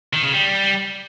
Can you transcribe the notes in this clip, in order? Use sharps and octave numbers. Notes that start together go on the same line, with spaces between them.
D#3
C#3
G3